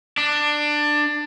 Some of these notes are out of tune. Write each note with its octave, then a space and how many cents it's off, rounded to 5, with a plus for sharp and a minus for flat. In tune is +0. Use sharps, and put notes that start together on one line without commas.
D4 +15